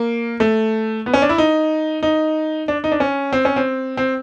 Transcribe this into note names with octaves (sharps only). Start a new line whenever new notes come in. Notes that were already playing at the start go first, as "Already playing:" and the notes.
Already playing: A#3
A3
B3
C#4
D4
E4
D#4
D#4
D4
D#4
D4
C#4
C4
C#4
C4
C4